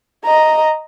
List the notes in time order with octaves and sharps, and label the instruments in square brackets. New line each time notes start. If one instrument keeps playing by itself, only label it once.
[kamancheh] D#5 A#5